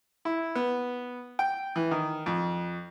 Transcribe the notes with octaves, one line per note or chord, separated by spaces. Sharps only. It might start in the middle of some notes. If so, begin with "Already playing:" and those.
E4
B3
G5
E3
D#3
F2